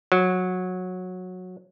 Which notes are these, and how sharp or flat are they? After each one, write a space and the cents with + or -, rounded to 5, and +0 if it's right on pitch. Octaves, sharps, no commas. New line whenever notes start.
F#3 -15